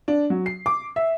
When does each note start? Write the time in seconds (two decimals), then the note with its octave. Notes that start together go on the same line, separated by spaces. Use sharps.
0.08 D4
0.30 F#3
0.46 C7
0.66 D6
0.96 E5